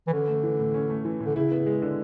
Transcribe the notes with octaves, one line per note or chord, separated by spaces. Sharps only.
E3
D3 C#4
A3
E3
A2
C#4
A3
E3
A2
D3
C#3 E4
B3
G#3
D3